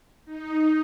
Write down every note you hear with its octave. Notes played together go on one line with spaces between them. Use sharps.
D#4